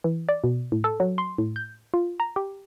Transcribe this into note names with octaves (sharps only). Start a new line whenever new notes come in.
E3
D5
B2
A2
A4
F#3
C6
A2
G6
F4
A#5
G4